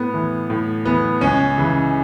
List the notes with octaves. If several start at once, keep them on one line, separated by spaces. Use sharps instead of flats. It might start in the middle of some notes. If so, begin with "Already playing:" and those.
Already playing: A2 B3
E3
A2
E3 B3
C#2 C#4
C#3 E3